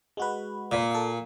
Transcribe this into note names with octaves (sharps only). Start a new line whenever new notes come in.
G#3 F#4 B4
A#2
A4 F5